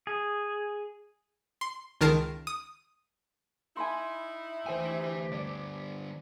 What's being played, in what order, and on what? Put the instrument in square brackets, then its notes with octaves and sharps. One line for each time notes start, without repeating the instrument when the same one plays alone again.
[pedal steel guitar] G#4
[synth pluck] C6
C#2 D#3 A#4 A5 C7 D7
D#6
[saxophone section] D#4 E4 [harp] G#5 B5 C6
[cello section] D2 G4 [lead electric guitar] E3 G#5 [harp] C5 G5
[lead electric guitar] D3 G3 [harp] D5